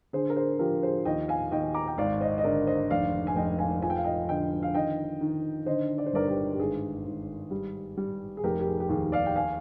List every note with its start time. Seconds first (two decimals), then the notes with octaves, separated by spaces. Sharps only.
0.13 D3 G#4 C5
0.30 A#4
0.36 G#4 C5
0.59 F3 G4 A#4
0.83 G#4 C5
1.05 D#2 D#5 G5
1.28 F5 G#5
1.51 D#2 D#5 G5
1.74 A#5 D6
1.88 G5
1.98 G#1 D5 F5
2.21 C5 D#5
2.38 D#5
2.44 D3 A#4 D5
2.67 C5 D#5
2.90 F1 D5 F5
3.27 G#5
3.36 F1 D#5 G5
3.59 F5 G#5
3.82 F3 G#5
3.90 G5
3.97 F5
4.04 D#5 G5
4.28 D3 D#5 G5
4.63 F5
4.75 D#3 D#5 G5
5.21 D#3
5.66 D3 C5 D#5
5.98 D5
6.06 C5
6.13 G1 A#4 D5
6.28 G4 A#4
6.53 G4
6.59 G#1 G#4
7.05 G#1
7.51 G3
7.97 G3
8.37 G#4
8.44 F1 G4 A#4
8.60 G4
8.66 G#4
8.80 G4
8.89 D#2 G#4
9.12 D5 F5
9.26 G5
9.36 F5 G#5